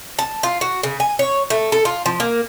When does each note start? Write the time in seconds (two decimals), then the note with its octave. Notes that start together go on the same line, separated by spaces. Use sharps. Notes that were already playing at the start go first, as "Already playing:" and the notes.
0.19 A5
0.43 F4
0.61 F#4
0.83 C#3
1.00 G#5
1.19 C#5
1.50 A3
1.72 A4
1.85 F4
2.06 F3
2.20 A#3